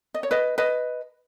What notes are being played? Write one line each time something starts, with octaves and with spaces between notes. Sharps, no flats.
D#5
C#5
B4 D#5
B4 D#5